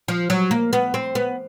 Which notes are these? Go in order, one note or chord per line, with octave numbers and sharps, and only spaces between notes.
F3
F#3
A#3
B3
C4
B3